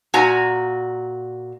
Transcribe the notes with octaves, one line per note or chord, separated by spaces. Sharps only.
A#2 F#4 G#5 A#5